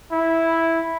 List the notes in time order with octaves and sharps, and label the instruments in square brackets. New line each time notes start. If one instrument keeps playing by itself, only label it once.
[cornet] E4